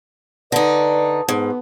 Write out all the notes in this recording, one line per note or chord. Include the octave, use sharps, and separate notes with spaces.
D3 D#4 B4 D5
G#2 B3